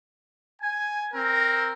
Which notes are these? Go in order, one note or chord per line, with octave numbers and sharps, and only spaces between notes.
G#5
C4 A#4